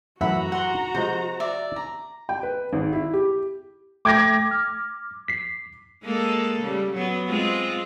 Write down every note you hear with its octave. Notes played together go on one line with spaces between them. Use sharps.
F#2 A2 E3 F#4 E5 F#5 A#5 B5
F#5 C6
C3 F3 G#3 C5
D5 E5
A#5
G5
B4
G#1
E4
G4
A3 G5 D6 G#6 A#6
F6
B6 C7
G#3 A#3 A4
C#3 G3
F#3 B3
G#3 C4 F4